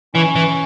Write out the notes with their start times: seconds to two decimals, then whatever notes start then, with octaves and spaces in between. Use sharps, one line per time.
0.14 E3 C#4
0.36 E3